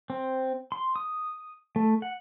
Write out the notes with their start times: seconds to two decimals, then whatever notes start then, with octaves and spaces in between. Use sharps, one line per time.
0.10 C4
0.72 C6
0.96 D#6
1.76 A3
2.02 F#5